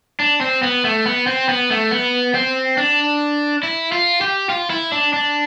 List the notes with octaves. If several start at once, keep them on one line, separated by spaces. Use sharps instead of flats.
D4
C4
B3
A3
B3
C4
B3
A3
B3
C4
D4
E4
F4
G4
F4
E4
D4
D4